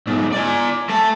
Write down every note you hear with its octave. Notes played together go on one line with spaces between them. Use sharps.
B1 G#2
D5 G#5
A3 A5